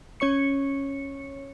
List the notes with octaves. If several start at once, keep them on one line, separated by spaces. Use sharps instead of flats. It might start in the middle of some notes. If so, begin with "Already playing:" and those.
C#4 C#5 C#6 C#7